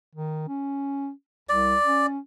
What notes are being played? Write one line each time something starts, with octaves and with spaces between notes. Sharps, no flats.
D#3
C#4
C2 D5
C#4